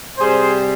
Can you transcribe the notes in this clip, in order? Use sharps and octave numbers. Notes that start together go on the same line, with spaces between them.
C3 G3 G#4 C5